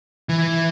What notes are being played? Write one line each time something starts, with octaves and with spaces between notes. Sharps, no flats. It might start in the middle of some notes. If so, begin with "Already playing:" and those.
E3